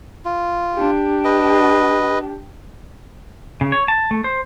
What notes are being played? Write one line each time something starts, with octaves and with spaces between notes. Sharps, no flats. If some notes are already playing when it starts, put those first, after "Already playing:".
F4
D4 G4
B4 D#5
C#3
C#5
A5
A3
C5